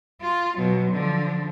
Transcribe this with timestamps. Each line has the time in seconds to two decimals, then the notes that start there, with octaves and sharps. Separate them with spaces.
0.21 F4
0.57 B2 F#3
0.91 D3 F3